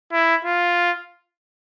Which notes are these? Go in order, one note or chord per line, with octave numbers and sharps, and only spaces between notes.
E4
F4